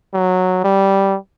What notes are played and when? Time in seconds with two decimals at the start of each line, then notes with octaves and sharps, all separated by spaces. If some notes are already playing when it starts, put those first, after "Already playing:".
0.14 F#3
0.64 G3